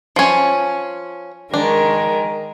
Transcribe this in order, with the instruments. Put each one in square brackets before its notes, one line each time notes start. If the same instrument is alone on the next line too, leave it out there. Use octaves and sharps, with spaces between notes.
[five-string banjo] F3 C#4
[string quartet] D#3 G#3 A#4 [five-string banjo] D4